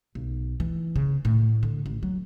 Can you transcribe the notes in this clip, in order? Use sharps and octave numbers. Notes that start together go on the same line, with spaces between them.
B1
E3
C#3
A2
D3
A1
F#3